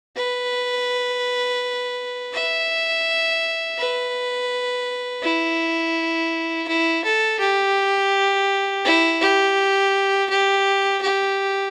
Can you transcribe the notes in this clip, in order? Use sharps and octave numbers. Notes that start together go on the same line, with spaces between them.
B4
E5
B4
E4
E4
A4
G4
E4
G4
G4
G4